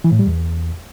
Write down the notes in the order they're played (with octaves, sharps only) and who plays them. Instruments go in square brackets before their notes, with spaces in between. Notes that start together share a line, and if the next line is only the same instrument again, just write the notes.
[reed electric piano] E3
A2
G3
E2